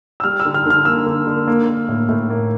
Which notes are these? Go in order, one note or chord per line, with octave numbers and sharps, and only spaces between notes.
E6
G3 F6
E6
D3
F6
D3 F6
A#3 E6
D3
D3
A#3
A#3
A2
A2
A#3